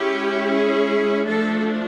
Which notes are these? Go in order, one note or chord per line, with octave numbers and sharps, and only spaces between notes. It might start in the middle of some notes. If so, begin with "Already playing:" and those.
Already playing: G#3 C#4 E4 G4
G#4
F3 A3 D4 A4